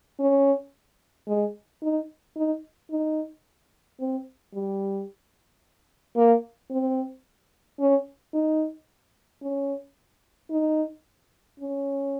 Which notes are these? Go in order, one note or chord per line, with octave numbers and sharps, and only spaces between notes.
C#4
G#3
D#4
D#4
D#4
C4
G3
A#3
C4
C#4
D#4
C#4
D#4
C#4